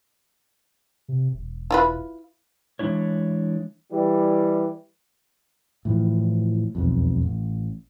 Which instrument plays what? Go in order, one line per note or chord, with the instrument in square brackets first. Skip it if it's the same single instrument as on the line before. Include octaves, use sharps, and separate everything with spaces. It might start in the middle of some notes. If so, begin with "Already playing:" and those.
[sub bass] C3
E1
[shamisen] E4 F4 B4
[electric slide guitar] E3 G#3 D4 E4 C#5
[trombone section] E3 G3
[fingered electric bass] A2 E3 F3
E1 B1 F2
A1